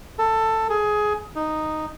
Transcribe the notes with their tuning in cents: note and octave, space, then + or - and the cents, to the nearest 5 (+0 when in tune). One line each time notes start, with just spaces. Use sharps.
A4 +15
G#4 +15
D#4 -5